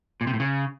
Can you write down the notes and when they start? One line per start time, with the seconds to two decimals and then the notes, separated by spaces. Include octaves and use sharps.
0.21 A#2
0.27 C3
0.33 A2
0.40 C#3